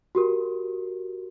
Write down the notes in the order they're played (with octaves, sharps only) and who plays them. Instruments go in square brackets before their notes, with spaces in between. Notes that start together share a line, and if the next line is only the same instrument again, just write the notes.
[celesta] F#4 G4 A#4